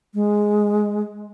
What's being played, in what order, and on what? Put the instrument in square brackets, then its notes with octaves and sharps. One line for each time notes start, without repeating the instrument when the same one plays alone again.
[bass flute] G#3